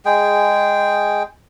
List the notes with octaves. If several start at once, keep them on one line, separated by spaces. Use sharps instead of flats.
G#3 G#4 G5